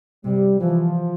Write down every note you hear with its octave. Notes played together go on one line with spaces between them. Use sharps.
C3 G3
E3 F3